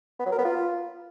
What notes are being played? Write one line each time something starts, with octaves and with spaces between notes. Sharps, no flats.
B3
F#3
A#4
B3
F4